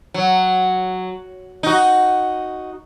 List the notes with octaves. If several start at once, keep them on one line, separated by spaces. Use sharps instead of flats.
F#3
D#4 F#4